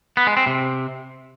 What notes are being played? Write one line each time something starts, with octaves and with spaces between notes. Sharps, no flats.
B3
G#3
C4
C3